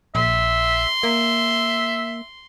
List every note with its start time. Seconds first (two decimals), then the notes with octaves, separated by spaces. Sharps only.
0.15 A#1 E5 C6
1.03 A#3 E5